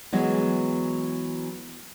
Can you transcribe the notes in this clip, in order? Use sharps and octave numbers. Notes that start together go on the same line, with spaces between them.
E3 F#3 G#3 B3